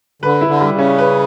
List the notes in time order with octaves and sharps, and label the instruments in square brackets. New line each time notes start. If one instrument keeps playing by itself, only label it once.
[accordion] D3 [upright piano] B4
[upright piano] E4
[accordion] D3
[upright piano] G3
[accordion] C#3
[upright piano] C#4
B4